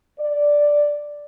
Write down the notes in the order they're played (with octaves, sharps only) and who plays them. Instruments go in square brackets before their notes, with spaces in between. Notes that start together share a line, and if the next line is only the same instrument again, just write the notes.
[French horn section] D5